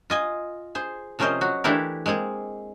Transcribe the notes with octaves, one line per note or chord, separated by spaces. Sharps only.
F4 D#5 G#5
G#4 C5
C3 F3 C#4 A#4 C5 D#5
F#3 F#4
E3 A3 D4 E4 G4 A#4
G#3 A#3 C4 G#4